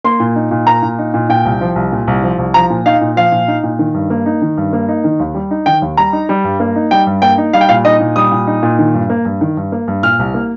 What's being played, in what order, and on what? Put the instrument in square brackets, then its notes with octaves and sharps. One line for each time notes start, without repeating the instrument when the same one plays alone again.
[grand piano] A#3 C6
A#2
D#4
A#2
A#3 A#5
A#2
D#4
A#2
A#2 G5
C2
F3
C2
A#2
C2
F3
C2
F3 A#5
A#2
D#4 F5
A#2
F3 F5
A#2
D#4
A#2
D#3
G2
A#3
D#4
D#3
G2
A#3
D#4
D#3
D#2
G3
D#4
D#3 G5
D#2
G3 A#5
D#4
G3
G2
A#3
D#4
G3 G5
G2
A#3 G5
D#4
G3 F5
G5
A#2 F5
D#4 D#5
A#2
G3 D#6
A#2
D#4
A#2
D#3
G2
A#3
G2
D#3
G2
A#3
G2
A#2 F6
C2
A#3